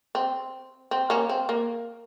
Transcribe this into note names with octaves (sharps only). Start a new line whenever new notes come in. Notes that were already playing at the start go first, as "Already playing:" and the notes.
C4
C4
A#3 C#4
C4
A#3